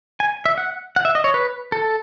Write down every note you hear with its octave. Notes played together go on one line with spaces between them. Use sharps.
G#5
E5
F#5
F#5
E5
D#5
C#5
B4
A4